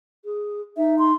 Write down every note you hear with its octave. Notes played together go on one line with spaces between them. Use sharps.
G#4
D#4 E5
C6